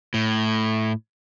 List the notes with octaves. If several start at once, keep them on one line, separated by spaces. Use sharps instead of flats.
A2